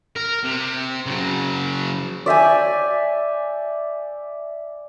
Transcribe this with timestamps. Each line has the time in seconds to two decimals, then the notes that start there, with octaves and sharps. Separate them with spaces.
0.16 A#4
0.44 C3
1.06 C#3 F#3
2.26 D5 E5 G5 G#5